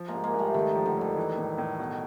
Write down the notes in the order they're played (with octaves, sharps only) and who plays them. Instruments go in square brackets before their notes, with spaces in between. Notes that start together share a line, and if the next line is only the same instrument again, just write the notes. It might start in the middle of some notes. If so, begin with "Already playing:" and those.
Already playing: [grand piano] F3
[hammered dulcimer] G#3 A#3
[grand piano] G#2
[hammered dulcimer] G#3 A#3
[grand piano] G#2
[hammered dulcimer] G3 A3
[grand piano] D#2 [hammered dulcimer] D#3
[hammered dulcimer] D#3 [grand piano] F3
[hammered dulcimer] D3
[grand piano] F1 [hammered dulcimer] D#3
[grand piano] E3
A2
A2
B2